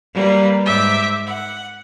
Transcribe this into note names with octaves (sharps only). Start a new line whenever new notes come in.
G3 A#3 B4
G#2 E5 D6 G6
F#5